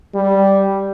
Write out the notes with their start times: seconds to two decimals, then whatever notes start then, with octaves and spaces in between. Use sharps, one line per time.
0.14 G3